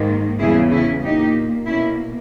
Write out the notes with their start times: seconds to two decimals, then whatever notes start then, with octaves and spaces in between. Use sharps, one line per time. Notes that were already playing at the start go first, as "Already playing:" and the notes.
Already playing: G#2 D#3 A#3
0.39 E2 C#3 G3 E4 G#4
0.71 C#4 E4
1.03 A#2 A#3 D#4 G4
1.67 B2 A#3 C#4 E4